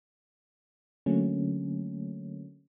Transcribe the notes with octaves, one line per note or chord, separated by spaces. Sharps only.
D3 F#3 A3 A#3 C#4